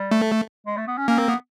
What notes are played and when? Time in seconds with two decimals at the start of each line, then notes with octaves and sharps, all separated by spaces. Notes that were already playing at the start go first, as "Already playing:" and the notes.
Already playing: G3
0.11 A3
0.67 G#3
0.77 A3
0.87 B3
0.98 C#4
1.08 A#3 C#4
1.18 C4
1.29 B3